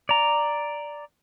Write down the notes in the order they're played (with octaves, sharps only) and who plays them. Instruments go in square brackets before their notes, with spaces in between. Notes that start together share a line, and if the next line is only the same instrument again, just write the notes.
[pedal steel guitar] D5 A#5